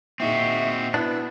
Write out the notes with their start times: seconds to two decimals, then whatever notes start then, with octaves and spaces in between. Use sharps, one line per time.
0.20 A#2 C4 D#4 F#4 G#4 E5
0.94 B2 B3 D4 E4